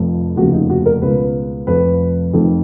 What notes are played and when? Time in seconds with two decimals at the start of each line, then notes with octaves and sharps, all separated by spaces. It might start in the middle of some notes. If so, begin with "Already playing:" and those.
Already playing: F1 F2 F3
0.36 F1 D#2 C#3 F3 F#4
0.53 D#4
0.70 F#4
0.86 A#4
1.02 C#2 B2 B4
1.67 F1 F2 F3 B4
2.34 F1 F2 D#3